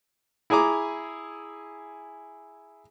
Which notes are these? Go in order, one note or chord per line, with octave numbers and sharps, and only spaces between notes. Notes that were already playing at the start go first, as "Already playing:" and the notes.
E4 G#4 G#5 A#5 D6